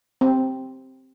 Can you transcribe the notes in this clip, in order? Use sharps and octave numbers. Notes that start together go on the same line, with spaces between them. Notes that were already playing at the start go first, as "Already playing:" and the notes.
C4